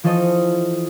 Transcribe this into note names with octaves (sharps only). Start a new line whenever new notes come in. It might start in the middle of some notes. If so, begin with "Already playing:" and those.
E3 F3 C#4 A4 C5 D#5